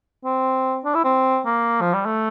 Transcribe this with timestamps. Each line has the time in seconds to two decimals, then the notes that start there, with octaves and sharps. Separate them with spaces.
0.24 C4
0.85 D4
0.95 E4
1.04 C4
1.45 A#3
1.81 F3
1.93 G3
2.05 A3